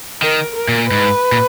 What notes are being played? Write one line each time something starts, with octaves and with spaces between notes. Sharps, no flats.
D#3 A#4
A#4
A#2
G#2 B4
A#2